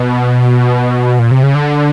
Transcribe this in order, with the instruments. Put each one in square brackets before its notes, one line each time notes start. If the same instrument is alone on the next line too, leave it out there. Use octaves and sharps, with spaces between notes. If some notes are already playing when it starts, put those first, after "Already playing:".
Already playing: [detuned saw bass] B2
A#2
C3
C#3
D3